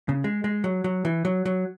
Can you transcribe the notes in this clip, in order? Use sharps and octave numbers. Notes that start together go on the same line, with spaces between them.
C#3
G#3
G#3
F#3
F#3
E3
F#3
F#3